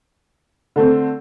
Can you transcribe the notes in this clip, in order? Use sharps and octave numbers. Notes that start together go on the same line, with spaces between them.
D3 A3 C4